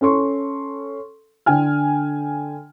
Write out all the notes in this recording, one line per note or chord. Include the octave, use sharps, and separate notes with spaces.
C#4 A4 C6 C#6
D3 G5 G#5 F6